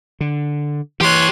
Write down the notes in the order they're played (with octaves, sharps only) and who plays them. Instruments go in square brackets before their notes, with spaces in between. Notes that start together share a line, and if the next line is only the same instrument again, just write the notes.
[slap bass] D3
[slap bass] E3 [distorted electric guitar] G4 C#5 [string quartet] C6 F#6